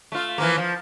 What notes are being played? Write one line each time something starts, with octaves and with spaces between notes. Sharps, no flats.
A3 F4
E3 F3 A#3
F3